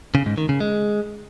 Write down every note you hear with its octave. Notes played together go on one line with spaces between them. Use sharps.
C#3
G#2
D#3
C#3
G#3